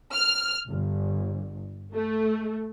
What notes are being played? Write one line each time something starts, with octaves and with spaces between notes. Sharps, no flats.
F6
G1
A3